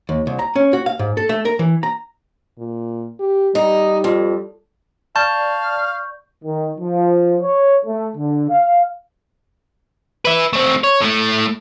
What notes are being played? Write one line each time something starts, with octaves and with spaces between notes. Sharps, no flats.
D#2
C2
A#5
C#4
F#4
F5
G#2
A4
A3
A#4
E3
A#5
A#2
G4
G3 D#4
F2
D5 F5 A5 C#6 G6
D#3
F3
C#5
A3
D3
F5
B4 E5
A3 C4
C#5
A2 A3